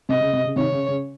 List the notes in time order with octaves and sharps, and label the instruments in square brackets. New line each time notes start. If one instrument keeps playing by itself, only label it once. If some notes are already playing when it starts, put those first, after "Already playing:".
[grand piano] C3 [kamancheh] D#5
[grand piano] C#3
C3
C#3
[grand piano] C3 D#3 [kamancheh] C#5
[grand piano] C#3
C#3